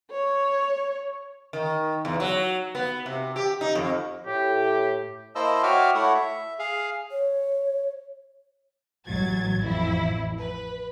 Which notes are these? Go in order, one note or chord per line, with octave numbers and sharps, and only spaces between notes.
C#5
D#3
E2
F#3
B3
C3
G4
D#4
F2
A2 G4
A#3 E4 C5 D#5 A5 E6
F#4 C#5 E5 G5 D6 F6
A3 E4 C#5 F#5
E5
G#4 F5
C#5
A1 F#3 G#6 A6
A1 F2 E4
B4